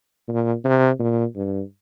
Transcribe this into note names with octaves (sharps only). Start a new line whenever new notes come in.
A#2
C3
A#2
G2